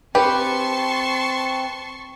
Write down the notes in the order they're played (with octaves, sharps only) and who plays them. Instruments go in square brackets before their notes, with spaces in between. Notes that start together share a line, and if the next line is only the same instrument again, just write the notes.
[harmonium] C4 [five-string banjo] G4 [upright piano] B4 [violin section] A5 C6 C#6